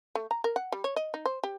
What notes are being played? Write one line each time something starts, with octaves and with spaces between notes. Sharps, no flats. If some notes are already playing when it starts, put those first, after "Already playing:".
A3
A#5
A#4
F#5
G3
C#5
D#5
D#4
C5
G4